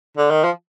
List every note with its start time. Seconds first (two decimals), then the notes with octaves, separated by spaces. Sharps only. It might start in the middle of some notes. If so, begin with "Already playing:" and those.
0.17 D3
0.30 D#3
0.44 F3